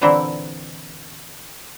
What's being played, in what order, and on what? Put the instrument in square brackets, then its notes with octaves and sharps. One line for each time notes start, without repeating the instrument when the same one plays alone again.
[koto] A#2 D3 E3 C4 E4